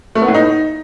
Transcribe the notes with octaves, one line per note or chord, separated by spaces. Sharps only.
A3
B3
A2
D#4